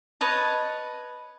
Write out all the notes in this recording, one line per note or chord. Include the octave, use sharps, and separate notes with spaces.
B4 C#5 D#5 A5